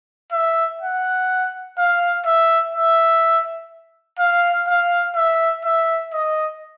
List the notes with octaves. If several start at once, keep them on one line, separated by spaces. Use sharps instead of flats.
E5
F#5
F5
E5
E5
F5
F5
E5
E5
D#5